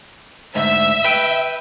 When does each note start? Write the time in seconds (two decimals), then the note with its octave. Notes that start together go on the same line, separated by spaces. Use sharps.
0.55 D2 G#2 E5
1.04 B4 G5